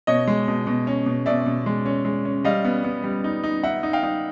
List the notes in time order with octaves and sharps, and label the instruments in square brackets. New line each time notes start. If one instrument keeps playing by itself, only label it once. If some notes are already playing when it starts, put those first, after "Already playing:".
[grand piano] B2 C#5 D#5
G#3
B2
B2
C#4
B2
B2 D5 E5
B2
G#3
C#4
G#3
C#4
G3 D#5 F5
B3
B3
G3
D#4
D#4
D#4 E5 F#5
D#4
F5 G5
D#4